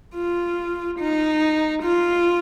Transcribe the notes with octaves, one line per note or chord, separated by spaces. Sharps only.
F4
D#4
F4